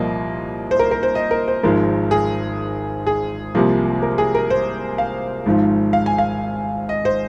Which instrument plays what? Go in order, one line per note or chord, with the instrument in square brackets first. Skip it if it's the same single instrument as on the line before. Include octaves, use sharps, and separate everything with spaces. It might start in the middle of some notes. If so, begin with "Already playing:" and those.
Already playing: [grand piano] C2 A#2 F3 A#3 D#5
C5
A#4
A#4
C5
D#5
A#4
C5
G#1 G#2 F3 G#3 A#4
G#4
G#4
C2 C3 F3 A#3
A#4
G#4
A#4
C5
F5
G#1 G#2 F3
F5
G#5
F5
D#5
C5